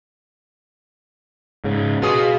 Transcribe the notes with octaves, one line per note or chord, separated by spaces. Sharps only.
G#2 C#3
B2 F4 F#4 G#4